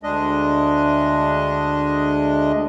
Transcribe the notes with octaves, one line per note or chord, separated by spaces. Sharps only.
D2 G#3 D4 D#5